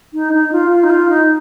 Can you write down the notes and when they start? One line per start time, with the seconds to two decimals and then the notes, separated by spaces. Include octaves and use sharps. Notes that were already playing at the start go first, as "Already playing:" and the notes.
0.13 D#4
0.32 D#4
0.52 F4
0.70 F4
0.83 D#4
0.89 F4
1.08 D#4